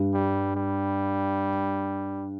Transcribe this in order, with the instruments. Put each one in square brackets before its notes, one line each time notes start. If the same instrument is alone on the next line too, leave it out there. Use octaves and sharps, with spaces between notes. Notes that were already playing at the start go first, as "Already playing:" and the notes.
Already playing: [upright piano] G2
[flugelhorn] G3
G3